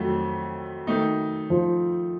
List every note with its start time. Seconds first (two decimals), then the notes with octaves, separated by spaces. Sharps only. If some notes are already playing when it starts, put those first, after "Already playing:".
Already playing: F2 D#3 F#3 A3
0.87 D#3 A3 D#4
1.50 F3